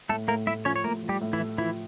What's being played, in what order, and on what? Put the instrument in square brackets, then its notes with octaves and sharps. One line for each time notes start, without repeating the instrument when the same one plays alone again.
[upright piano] A2 [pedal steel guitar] A3 A4
[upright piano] A2 [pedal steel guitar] A#3 A#4
[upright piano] A2 [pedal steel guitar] E4 E5
[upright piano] F3 [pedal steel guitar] C#4 C#5
[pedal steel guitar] C#5
[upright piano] A2 [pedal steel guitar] A#3 A#4
[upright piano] F3
[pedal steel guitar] G3 G4
[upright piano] A2
[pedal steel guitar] E3 E4
[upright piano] A3
[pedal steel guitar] E3 E4 [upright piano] F3